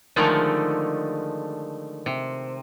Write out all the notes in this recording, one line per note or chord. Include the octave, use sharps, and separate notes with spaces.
D3 D#3 F3 G#3 A3
C3